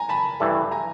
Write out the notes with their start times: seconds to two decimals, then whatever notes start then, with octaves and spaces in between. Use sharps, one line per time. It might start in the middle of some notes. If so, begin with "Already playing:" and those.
Already playing: G#5 A#5
0.09 A5 B5
0.40 G2 E3 A3
0.71 G#5 A#5